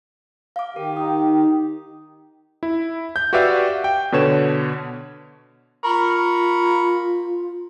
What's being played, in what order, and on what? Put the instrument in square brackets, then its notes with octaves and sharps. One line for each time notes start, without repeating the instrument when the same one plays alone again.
[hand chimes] F5 D6
[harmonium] D#3 G4 [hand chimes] A#4
[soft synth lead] D#4 [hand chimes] D#6
[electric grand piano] E4
G6
F#4 G4 B4 D5 E5 F5
G5
B2 D3 B4 C#5 E7
[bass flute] F4 [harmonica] A#4 B5 C#6